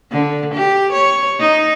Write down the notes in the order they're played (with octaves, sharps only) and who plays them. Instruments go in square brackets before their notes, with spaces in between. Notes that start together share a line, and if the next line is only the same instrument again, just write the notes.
[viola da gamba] D3
G4
C#5
D#4